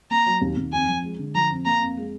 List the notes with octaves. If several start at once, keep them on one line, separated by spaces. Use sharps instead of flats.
A#3 A#5
F#3
D#2
D#2
F2 G#5
F3
G#3
D3
F3 A#5
F2
A#3 A#5
F2
G#3